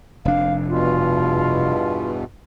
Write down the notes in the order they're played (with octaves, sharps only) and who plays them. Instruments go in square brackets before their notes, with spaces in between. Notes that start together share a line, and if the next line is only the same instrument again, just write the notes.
[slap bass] F1 D4 [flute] F5
[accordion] E2 G2 B2 [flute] F4